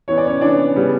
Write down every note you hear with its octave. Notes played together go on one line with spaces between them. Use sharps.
E3 B3 C#5
D5
C#4 C#5
E3 B3 D4 D5
C#3 G3 B3